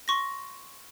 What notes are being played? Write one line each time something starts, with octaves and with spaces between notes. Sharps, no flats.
C6 C#6 A#6